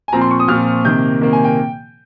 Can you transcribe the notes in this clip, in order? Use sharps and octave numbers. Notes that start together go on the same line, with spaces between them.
G#5
A#2 F3 C4 A#5
C6
C#6
D#6
A#2 F3 C4 F6
C3 D#3 A#3 G6
C3 D#3 A#3
G#5
G5